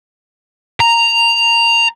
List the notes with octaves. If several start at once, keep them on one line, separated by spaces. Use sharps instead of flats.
A#5